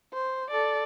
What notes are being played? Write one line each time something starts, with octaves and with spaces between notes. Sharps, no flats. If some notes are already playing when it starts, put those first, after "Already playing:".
C5
A4 D5